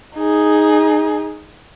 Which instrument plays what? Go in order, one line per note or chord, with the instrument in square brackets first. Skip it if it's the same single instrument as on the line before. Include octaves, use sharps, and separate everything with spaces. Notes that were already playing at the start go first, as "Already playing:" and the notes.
[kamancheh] D#4 G#4